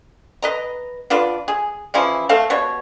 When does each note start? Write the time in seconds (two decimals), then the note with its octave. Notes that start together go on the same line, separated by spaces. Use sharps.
0.42 B4 D#5 A#5
1.10 D3 F4 B4 D5
1.48 G#4
1.94 C#3 E3 F3 E4
2.29 A3 C4 A4 F5
2.50 B2 G3 C#5